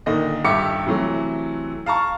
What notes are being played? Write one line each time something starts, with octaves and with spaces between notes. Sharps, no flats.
A#2 D3 D#3 D#5 A#6
D#1 G2 G4 E5 D6 C#7
C3 E3 F#3 A3
F5 A5 A#5 C#6